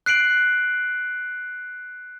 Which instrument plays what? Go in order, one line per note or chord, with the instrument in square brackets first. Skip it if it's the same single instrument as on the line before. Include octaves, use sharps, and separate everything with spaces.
[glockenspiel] F#6 C7 D7 F#7